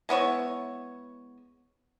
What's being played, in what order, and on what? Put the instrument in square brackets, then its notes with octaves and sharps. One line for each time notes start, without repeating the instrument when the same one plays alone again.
[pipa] G#3 B3 E4 C#5